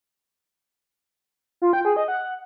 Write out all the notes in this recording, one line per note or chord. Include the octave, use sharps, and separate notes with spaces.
F4
G5
G#4
D#5
F#5